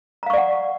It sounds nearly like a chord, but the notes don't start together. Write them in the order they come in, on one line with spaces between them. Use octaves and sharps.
A#5 F5 C#6 D5 F#5